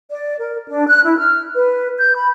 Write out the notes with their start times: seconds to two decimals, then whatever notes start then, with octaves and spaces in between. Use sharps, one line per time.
0.10 D5
0.39 A#4
0.67 D4
0.87 F#6
1.06 E4
1.18 F6
1.55 B4
1.98 G6
2.16 B5